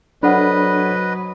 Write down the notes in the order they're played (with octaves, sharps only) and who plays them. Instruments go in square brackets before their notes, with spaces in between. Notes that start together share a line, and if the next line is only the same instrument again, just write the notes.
[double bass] F#3 [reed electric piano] D4 A4 [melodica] B4 D#5 [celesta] C5 F#5 B5